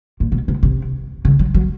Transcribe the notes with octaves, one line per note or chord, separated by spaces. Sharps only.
A#2
B2
C3
C3
C#3
F#3
F#3